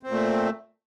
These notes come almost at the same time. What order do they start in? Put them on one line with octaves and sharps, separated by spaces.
C4 A#2 A3